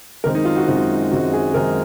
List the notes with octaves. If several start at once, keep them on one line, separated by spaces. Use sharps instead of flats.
F#2 D#3 G#3 C4 A#4
D#4
F4
F#4
F#2 D#3 G#3 C4 F4
F#2 D#3 G#3 C4 F#4
G#4
F#2 D#3 G#3 C4 A#4